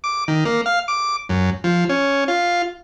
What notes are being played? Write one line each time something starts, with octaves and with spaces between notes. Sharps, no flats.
D6
D#3
A#3
F5
D6
F#2
F3
C#4
F4